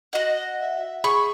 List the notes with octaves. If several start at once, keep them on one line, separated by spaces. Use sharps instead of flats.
F#4 D#5 F#5
E5
G#4 B5 C#6